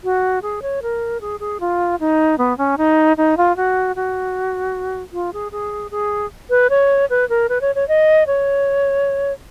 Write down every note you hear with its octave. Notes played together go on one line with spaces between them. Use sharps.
F#4
G#4
C#5
A#4
G#4
G#4
F4
D#4
B3
C#4
D#4
D#4
F4
F#4
F#4
F4
G#4
G#4
G#4
B4
C#5
B4
A#4
B4
C#5
C#5
D#5
C#5